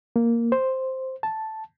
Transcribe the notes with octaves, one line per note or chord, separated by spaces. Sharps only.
A#3
C5
A5